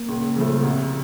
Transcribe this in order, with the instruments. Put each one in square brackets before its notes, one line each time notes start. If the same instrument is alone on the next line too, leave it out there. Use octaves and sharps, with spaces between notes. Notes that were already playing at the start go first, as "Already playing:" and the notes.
Already playing: [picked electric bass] A#3
[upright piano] C#2
C#3 F3 A3
C2